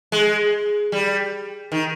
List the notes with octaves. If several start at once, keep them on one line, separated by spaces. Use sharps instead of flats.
G#3
G3
D#3